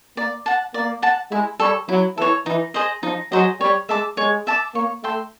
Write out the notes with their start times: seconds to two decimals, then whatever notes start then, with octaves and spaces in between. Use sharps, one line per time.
0.17 A#3 D5
0.46 F#5 A5
0.74 A#3 D5
1.02 F#5 A5
1.31 G#3 E4
1.60 G3 A4 C#5
1.89 F#3 E4
2.17 E3 A4 C#5
2.46 E3 D#4
2.74 G#4 C5 D#5
3.03 F3 D#4
3.32 F#3 G#4 C5 D#5
3.60 G3 C#5
3.89 G#3 E5 A5 D6
4.17 G#3 C#5
4.47 E5 A5 D6
4.75 A#3 C#5
5.04 A3 E5 G5 C6